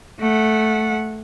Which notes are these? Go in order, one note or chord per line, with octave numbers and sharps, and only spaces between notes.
A3 F#5